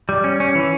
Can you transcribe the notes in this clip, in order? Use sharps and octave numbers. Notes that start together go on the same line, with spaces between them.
G3
C#4
C#4
E3